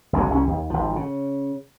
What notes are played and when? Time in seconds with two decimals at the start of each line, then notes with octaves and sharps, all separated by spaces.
0.13 F#1 C2 F#2 D3
0.31 C2 C#4
0.47 D#2
0.70 G#1 F3
0.96 C#3